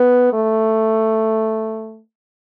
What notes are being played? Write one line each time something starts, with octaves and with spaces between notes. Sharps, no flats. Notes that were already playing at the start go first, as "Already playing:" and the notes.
Already playing: B3
A3